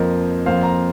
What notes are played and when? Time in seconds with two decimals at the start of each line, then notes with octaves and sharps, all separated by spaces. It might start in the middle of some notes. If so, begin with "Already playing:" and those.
Already playing: F2 F3 A#3 A#4 D#5
0.46 F2 F3 A#3 C5 F5
0.63 F5 A#5